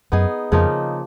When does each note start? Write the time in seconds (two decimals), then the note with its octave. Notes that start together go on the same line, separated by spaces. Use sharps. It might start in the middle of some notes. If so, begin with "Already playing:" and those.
0.12 F#2 B3 D#4 G#4
0.52 F2 C#3 F3 A#3 D#4